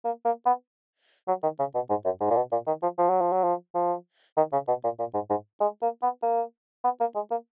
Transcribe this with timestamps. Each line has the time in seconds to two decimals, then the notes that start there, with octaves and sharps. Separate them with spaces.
0.05 A#3
0.25 A#3
0.46 B3
1.28 F#3
1.43 D#3
1.59 C#3
1.75 B2
1.90 G#2
2.05 F#2
2.21 G#2
2.30 A#2
2.36 B2
2.52 A#2
2.67 D#3
2.83 F3
2.98 F3
3.10 F#3
3.21 F3
3.32 F#3
3.44 F3
3.75 F3
4.37 D#3
4.53 C#3
4.68 B2
4.84 A#2
4.99 A#2
5.14 G#2
5.30 G#2
5.61 G#3
5.82 A#3
6.02 B3
6.23 A#3
6.84 B3
7.00 A#3
7.15 G#3
7.31 A#3